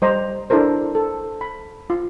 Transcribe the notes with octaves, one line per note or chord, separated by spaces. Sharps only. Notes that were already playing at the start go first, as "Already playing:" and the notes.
G3 C5 D#5 A#5
D4 E4 A4 A#4 C5
A4
B5
F4